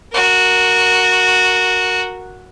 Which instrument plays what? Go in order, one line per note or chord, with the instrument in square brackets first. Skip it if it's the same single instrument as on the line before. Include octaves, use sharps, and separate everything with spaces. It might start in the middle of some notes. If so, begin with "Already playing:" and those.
[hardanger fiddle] F#4 A#4